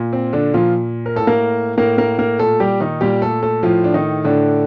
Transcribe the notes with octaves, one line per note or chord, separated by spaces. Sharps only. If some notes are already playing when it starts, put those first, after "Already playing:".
Already playing: A#2
C4
D3 D4
A#2 F3 F4
A#4
A2 A4
A#3 A#4
A2 A#3 A#4
A#3 A#4
A#3 A#4
A#2 A3 A4
G3 G4
D#3 D#4
A#2 G3 G4
A3 A4
A3 A4
A2 F3 F4
D4
D#3 D#4
A2 D3 D4